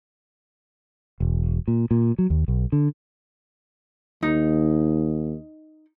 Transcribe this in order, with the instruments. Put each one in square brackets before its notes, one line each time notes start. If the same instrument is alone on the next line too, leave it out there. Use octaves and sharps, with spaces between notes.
[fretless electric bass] E1
A#2
A#2
F#3
D#2
B1
D3
[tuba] D#2 [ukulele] D#4